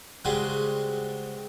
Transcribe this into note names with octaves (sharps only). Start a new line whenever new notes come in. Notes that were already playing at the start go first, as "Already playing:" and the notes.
C#3 G3 G#3 C4 F#4 B4